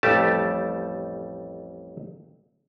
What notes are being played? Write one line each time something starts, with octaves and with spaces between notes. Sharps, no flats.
A1 F2 G3 A3 G4 A5